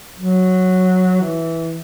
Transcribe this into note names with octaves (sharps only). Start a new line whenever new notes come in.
F#3
E3